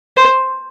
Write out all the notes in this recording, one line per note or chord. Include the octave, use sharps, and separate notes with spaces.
C5